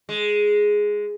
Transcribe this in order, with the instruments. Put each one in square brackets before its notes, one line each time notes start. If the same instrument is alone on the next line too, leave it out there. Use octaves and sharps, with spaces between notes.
[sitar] G#3